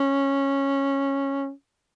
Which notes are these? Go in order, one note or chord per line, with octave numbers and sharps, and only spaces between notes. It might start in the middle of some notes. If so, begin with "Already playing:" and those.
Already playing: C#4